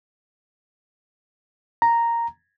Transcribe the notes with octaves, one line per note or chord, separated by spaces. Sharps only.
A#5